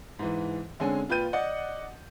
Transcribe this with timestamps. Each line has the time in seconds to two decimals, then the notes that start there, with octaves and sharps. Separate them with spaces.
0.19 G#2 E3
0.80 D3 G#3 C4 C#4 G#5
1.09 A#2 F4 B4 G5 G6 D#7
1.33 D5 D#5 F#5